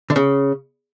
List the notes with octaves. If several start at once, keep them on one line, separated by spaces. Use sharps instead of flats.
D3
C#3